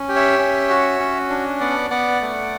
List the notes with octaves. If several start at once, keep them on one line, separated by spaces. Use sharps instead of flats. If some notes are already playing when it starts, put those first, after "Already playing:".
Already playing: C#4
G4
C#5 E5
C#4
F#4
C#4
D4
B3 D5 F#5
B3 D5 F#5
A3